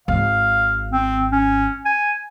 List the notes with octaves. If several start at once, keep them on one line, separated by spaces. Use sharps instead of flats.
G#1 F5
C4
C#4
G#5